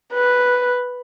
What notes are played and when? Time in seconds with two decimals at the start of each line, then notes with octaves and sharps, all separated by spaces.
0.13 B4